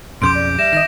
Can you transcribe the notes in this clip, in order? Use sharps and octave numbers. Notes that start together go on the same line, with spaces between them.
B1 F2 C#3 C6 D6 G6 D7
D5
G3 E5 A#6 E7
D#3 D#5 A#6